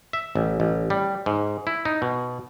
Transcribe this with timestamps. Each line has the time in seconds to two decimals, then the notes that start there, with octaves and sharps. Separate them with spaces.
0.13 E5
0.35 A1
0.60 A1
0.90 G3
1.26 G#2
1.67 E4
1.85 D#4
2.02 B2